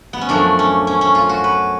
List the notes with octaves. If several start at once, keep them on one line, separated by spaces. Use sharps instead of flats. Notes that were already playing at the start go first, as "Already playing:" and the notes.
B3
C#4
F#2 F3 A3 D4
C#4
C#4
C#4
F4
F#4
B4